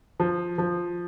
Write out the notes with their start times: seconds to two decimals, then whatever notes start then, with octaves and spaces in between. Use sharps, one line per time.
0.20 F3
0.58 F3